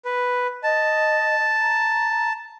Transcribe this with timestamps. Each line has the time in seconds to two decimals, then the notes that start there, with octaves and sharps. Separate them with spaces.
0.05 B4
0.63 D#5 A5
1.61 A#5